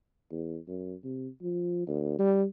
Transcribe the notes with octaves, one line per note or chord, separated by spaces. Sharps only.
E2
F#2
C3
F3
D2
G3